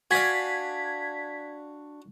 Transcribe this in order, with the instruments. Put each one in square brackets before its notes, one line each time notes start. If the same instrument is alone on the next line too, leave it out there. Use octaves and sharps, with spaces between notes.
[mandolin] D4 G#5 [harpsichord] F#4 F5 [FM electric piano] G#6 B6